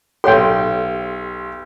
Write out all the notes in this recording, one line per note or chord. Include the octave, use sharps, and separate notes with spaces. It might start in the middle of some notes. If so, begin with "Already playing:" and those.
B1 G4 A4 C#5 F#5 G5 C6